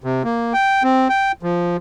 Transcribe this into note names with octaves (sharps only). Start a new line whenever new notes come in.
C3
A#3
G5
C4
G5
F3